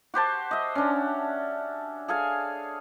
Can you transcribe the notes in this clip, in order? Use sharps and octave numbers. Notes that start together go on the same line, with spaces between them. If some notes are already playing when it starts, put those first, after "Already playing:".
F#4 G4 C5 A5
D#5 E5
C#4 D4
G#4 A4 F5 G#5